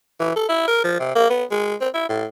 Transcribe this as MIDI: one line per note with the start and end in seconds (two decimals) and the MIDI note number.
0.20 0.35 52
0.36 0.44 69
0.49 0.68 64
0.68 0.79 70
0.84 0.99 53
1.00 1.14 48
1.15 1.29 58
1.30 1.44 59
1.51 1.75 56
1.81 1.89 60
1.94 2.06 64
2.09 2.26 45